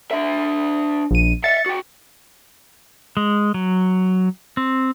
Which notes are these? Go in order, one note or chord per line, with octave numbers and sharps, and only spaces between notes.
D4 E5
A#1 D#7
E5 F5 A6 C#7
F#4 G5
G#3
F#3
C4